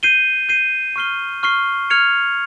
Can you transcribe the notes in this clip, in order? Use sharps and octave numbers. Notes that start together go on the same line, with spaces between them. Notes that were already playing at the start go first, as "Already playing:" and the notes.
G6 C7 D#7 G7
G6 C7 D#7 G7
C#6 F6 C7 G7
C#6 F6 C7 G7
F6 G#6 C#7 F7